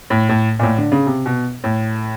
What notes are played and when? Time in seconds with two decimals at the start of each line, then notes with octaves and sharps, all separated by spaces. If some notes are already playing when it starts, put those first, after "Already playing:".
0.10 A2
0.29 A2
0.59 A#2
0.63 A2
0.78 D3
0.92 C#3
1.07 C3
1.26 B2
1.64 A2